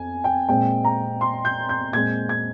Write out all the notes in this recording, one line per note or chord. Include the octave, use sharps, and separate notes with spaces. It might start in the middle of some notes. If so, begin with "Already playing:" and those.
Already playing: F2 G#5
G5
A#2 G#3 C4 G5
A#5
C6
G6
G6
A#2 G#3 C4 G#6
G#6